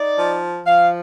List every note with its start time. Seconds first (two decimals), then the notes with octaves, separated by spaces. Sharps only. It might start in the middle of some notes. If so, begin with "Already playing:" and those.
Already playing: D#4 D5
0.18 F3
0.65 F3 F5